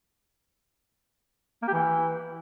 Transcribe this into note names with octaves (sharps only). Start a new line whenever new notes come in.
A#3
G4
E3